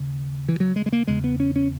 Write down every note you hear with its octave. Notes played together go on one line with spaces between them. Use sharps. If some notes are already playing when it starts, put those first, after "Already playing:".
Already playing: D#2 C#3
E3
F#3
G#3
G#3
A#3
E2 C#3 G#3
B3
C#4
C#4